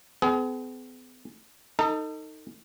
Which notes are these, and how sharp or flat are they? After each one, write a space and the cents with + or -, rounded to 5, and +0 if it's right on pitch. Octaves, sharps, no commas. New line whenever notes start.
B3 +45 G#4 +30
D#4 +0 A4 +35